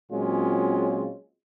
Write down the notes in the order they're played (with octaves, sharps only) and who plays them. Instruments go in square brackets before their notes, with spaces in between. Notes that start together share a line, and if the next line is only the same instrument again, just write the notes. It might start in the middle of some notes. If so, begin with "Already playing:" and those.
[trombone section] A#2 F#3 G#3 C4 C#4 F4